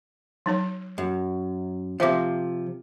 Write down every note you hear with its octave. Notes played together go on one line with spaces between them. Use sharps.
F#3 D#4 C#5
F#2
C3 F3 C5 E5 D6